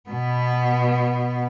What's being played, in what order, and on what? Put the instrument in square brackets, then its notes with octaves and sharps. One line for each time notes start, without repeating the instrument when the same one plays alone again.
[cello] B2 B3